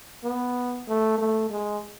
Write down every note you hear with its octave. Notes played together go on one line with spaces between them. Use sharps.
B3
A3
A3
G#3